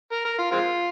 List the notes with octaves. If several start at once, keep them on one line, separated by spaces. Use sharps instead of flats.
A#4
A#4
F4
G#3 C4 F4